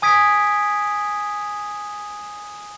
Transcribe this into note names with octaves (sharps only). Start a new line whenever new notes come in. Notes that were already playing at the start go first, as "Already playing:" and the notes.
G#5 D#6 G#6 B6 D7